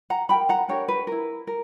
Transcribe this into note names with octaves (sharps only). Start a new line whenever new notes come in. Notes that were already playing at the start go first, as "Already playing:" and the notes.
F#5 A#5
D4 G4 A#4 G5 B5
F#5 A#5
D4 G4 A#4 C#5
B4
E4 A#4
A#4